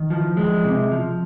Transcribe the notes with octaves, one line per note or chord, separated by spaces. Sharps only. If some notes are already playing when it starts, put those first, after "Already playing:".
Already playing: D#3
F3
G#3
C3
F3